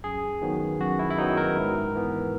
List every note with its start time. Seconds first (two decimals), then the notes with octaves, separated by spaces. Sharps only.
0.04 F#2 G#4
0.42 D#3 F#3 B3
0.80 F#2 F#4
0.99 E4
1.10 E4
1.18 D#3 F#3 B3 D#4
1.37 A#4
1.56 G#2
1.95 E3 B3